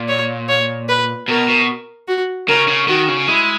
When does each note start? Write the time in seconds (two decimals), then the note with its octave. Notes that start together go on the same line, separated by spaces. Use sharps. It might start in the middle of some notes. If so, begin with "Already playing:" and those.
Already playing: A#2
0.08 C#5
0.48 C#5
0.89 B4
1.28 B2 A#4
1.48 B2
2.08 F#4
2.48 C#3 A#4
2.68 C#3
2.88 D#3 F#4
3.08 C#3
3.28 G#3 E4